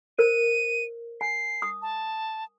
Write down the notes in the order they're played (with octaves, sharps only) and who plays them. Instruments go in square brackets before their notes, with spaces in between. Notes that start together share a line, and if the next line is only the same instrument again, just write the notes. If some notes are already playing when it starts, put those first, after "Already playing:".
[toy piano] A#4 C5 [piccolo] D#7
[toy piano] G#5 [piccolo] C7
[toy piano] D#6
[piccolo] A5